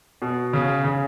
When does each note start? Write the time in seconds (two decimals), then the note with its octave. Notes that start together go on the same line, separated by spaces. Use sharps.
0.22 B2
0.53 C#3
0.84 C#3